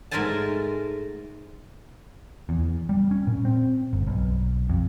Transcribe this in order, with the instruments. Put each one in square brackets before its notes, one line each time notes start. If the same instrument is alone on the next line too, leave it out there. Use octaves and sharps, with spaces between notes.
[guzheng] G#2 A3 A#4 C5 G#5 A5
[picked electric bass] E2
G3
C#4
A#2
C4
G1
B1
F2